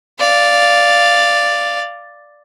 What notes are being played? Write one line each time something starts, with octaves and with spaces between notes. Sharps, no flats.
D5 F5